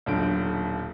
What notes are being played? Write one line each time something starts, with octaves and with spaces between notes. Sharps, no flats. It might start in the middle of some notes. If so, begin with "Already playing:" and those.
D#1 B1 D3 D7